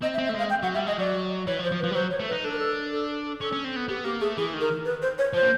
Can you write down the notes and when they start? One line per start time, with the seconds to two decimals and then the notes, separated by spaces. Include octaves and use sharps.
0.02 C4 D#5
0.14 E5
0.18 C4
0.26 E5
0.29 A3
0.34 G#3 F5
0.50 G5
0.63 F#3 F#5
0.74 G3 E5
0.87 G#3 D#5
0.99 F#3 D5
1.47 E3 C#5
1.59 F3
1.64 C5
1.72 F3
1.80 B4
1.83 F3
1.91 G3
1.95 F#3 C5
2.11 C#5
2.20 A3
2.28 B4
2.32 D#4
2.43 D4 A4
2.52 A#4
2.59 A4
2.92 A4
3.41 C#4 A4
3.52 C#4
3.64 C4
3.76 B3
3.88 B3 G4
4.04 A#3 G4
4.21 A3 G#4
4.37 E3 G#4
4.54 D#3
4.61 A#4
4.85 B4
5.02 C5
5.18 C#5
5.33 F3 C5
5.42 A#3